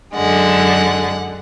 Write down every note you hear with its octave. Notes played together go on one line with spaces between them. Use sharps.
F#2 D3 G#3 F#5